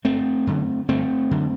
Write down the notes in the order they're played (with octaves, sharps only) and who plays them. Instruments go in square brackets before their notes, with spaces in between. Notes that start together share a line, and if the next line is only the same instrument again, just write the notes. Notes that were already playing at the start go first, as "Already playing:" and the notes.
[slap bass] G1 A3 C4
F#2 D3
G1 A3 C4
F#2 D3